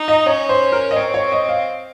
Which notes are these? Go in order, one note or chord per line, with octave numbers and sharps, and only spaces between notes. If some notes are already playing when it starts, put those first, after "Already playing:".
Already playing: D#4
D#5
C#4 C#5
C5
A#4
D#5
C4 C#5
C#5
D#5
F5